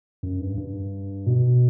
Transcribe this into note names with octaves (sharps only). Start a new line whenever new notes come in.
F#2
G2
G2
B2